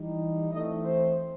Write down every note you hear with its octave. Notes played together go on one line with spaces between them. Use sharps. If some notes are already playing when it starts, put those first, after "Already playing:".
Already playing: E3 G3 D#4
E3 A3 C4 D#5
C5